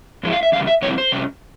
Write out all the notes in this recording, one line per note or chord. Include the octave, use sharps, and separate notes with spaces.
G#2 F3 G#3 E4
F5
E5
E2 C#3 G3 F5
E5
F2 C3 G3 C4 E4 C#5
C5
C3 G3 C#4